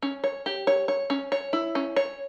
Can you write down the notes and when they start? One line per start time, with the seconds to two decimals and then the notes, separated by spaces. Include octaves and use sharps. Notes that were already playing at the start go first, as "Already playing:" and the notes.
0.03 C#4
0.24 C#5
0.46 G4
0.67 C#5
0.88 C#5
1.10 C#4
1.32 C#5
1.53 E4
1.75 C#4
1.96 C#5